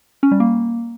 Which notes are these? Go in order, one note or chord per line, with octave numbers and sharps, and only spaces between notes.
C#4
G3
A#3